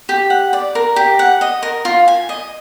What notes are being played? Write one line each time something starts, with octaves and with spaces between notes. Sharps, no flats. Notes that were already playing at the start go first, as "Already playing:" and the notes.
G4
F#5
D5
A#4
G4
F#5
D#5
A#4
F4
G#5
D#5